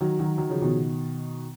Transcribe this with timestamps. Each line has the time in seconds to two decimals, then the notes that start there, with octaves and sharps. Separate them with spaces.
0.01 D#3 F#3
0.19 D#3 F#3
0.38 D#3 F#3
0.49 C#3 F3
0.62 B2 D#3